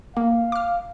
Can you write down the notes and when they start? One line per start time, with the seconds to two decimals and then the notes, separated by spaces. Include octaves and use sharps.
0.17 A#3 F5
0.52 D6 F6